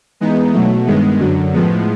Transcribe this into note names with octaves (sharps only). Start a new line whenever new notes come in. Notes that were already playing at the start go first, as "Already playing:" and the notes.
E3 G#3 B3 D#4
B2 F#3 A3
G2 D#3 G#3 B3
F#2 D3 F#3
A2 F3 G#3 B3